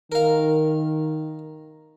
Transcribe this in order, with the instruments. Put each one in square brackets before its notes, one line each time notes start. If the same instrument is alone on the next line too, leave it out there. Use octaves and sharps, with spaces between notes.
[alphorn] D#3 [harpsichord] A#4 F5